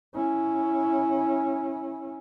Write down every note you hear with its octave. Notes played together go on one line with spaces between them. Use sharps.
C#4 E4